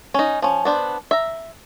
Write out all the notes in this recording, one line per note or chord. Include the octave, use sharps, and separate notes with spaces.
C#4 D#4
F3 C#4
B3 D4 C5
E5 A#5